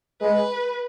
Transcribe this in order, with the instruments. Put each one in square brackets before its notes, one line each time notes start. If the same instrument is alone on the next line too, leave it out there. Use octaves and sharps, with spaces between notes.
[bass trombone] G#3 [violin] B4